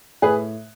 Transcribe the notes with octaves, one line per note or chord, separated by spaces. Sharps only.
A2 G#4 B4